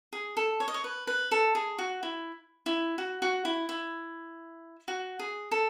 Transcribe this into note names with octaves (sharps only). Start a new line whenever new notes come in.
G#4
A4
C#5
D#5
C#5
B4
B4
A4
G#4
F#4
E4
E4
F#4
F#4
E4
E4
F#4
G#4
A4